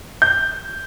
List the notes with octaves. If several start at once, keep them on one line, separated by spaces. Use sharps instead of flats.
G6